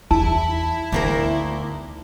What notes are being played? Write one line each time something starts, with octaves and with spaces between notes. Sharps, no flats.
E2 D#3 E4 A5
D2 D#3 A#3 A#4